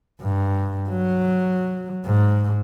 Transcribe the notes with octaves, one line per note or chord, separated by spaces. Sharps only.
G2
F#3
G#2